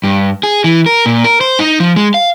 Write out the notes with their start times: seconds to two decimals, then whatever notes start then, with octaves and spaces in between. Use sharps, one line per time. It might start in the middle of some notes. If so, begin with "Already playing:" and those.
0.04 G2
0.43 G#4
0.64 E3
0.86 A#4
1.06 A#2
1.24 A#4
1.41 C5
1.59 D#4
1.80 F3
1.96 G#3
2.14 F5